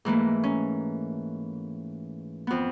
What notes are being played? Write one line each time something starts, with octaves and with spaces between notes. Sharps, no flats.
G#2 E3 A3 A#3
C#4
F2 B3